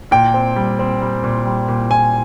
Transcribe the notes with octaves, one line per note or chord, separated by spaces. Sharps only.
A#2 G5
C4
G3
C4
G3
A#2
G3
A#2
A#2 G#5